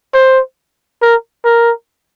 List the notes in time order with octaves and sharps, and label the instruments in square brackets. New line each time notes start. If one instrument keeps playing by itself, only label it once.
[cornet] C5
A#4
A#4